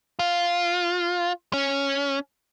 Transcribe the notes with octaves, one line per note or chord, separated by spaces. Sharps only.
F4
C#4